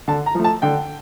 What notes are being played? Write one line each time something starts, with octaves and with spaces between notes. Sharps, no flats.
D3 A5
A#5
F3 A3
A5
D3 G5